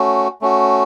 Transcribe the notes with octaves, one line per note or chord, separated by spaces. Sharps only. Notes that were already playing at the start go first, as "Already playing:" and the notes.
Already playing: A3 C#4 F#4
A3 C#4 F#4